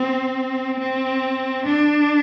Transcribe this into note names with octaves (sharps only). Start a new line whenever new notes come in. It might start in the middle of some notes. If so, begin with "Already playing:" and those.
Already playing: C4
C4
D4